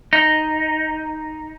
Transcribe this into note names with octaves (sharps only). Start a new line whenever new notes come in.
D#4